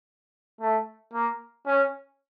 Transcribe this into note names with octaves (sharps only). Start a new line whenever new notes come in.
A3
A#3
C#4